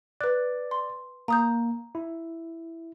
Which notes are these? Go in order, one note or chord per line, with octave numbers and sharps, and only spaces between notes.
B4 D5 F#6
C6
A#3 A#5 D#6 G6
E4